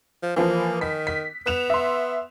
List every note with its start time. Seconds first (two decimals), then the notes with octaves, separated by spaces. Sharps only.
0.23 F3
0.36 E3 F3 A#3
0.81 D#3 B6
1.07 B6
1.46 B3 F#6 E7 F7
1.70 E5 C6